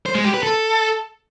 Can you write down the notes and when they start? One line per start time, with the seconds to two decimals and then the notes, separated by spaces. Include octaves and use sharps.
0.06 C5
0.15 G#3
0.24 G4
0.34 B4
0.43 A4